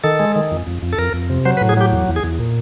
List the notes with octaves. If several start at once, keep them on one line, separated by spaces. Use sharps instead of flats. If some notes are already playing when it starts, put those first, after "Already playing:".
D#3 A4
G#3
D#3
F2
F2
F2
A4
F2 A#4
F2
C3
F#3 C5
B4
A2
G#4
F#3 G4
E2
E2
G#4
E2
A#2